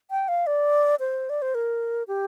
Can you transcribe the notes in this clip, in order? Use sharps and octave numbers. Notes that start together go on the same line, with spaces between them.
G5
F5
D5
C5
D5
C5
A#4
G4